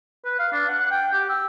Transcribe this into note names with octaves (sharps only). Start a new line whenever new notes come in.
B4
F5
D4
F#5
G5
G4
E6